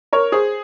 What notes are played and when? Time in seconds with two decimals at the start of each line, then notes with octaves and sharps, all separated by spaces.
0.13 A#4 C#5
0.32 G#4 C5